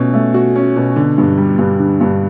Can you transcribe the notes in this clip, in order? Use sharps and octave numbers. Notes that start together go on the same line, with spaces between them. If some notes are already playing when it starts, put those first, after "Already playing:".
Already playing: B2 A3 C#4 F#4
A3
F#4
C#4
B2
D3
G2
G3
G2
D3
G2